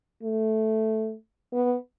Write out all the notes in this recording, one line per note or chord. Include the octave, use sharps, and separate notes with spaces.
A3
B3